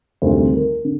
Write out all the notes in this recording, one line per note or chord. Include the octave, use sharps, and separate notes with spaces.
D2 C3 D#3 G3 C4 C5
A#4
D3